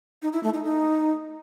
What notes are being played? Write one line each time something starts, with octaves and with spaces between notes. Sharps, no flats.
D#4
E4
A3
D#4
D#4